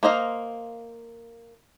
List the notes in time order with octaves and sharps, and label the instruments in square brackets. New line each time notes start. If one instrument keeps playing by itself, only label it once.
[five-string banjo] A#3 C5 D#5 F5